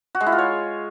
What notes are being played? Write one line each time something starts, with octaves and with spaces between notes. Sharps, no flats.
F#4
G#3
E4
F4
C#5